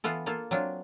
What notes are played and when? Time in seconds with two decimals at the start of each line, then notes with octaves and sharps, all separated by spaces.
0.04 E3 B3 F4 A4
0.26 A#3 F4 A4
0.51 F#3 C4 D4 F4